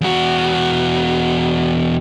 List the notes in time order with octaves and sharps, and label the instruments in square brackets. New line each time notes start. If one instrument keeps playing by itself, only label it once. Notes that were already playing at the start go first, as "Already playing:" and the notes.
[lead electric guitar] E2 F#4